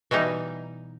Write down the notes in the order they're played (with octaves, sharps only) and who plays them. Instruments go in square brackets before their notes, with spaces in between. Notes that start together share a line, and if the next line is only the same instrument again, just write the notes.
[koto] B2 E3 G3 D#4